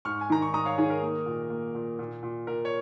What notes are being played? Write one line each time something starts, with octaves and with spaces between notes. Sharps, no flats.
G#2 C#6 F6
G#5
D#3 A#5
C#6
G#2 A#5 D#6
C#5 F5
D#3 G#4 C#5
A#4
A#3
A#2
A#3
A#2
A#2
A#2
A#2 A#4
C#5